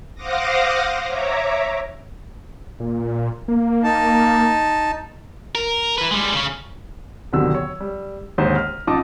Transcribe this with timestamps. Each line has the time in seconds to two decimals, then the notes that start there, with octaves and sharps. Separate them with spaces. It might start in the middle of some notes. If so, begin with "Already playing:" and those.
0.15 C5 F5 F#5 D6 D#6 A#6
1.07 C#5 E5 A#5 D6
2.80 A#2
3.48 A#3
3.84 D#4 A5
5.55 A#4
5.98 E4 B4
6.11 G3 G#3
6.34 C#3 C#4
7.32 D1 C2 B2 D3 D#3 E6
7.55 C#5
7.80 G3
8.38 D#2 G#2 D3 D#4 C5
8.56 F6
8.87 A1 D#4 F4 A5 D6 D#6